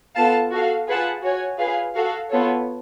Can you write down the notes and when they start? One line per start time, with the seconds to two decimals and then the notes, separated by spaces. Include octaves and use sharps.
0.15 B3 F4 A4 F5 A5
0.51 F#4 A4 F5
0.87 F4 G#4 B4 F#5 A5
1.23 F#4 C#5 G#5
1.59 F4 G#4 B4 F5
1.95 F#4 A4 F5
2.30 B3 F4 A4 C#5